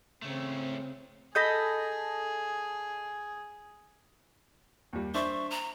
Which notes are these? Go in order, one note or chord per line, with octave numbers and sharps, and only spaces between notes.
C#3 A3 C4 C#4
G#4 A4 D#5 B5 G6 A#6
D#2 G3
D4 C5 E5 C#6
A#5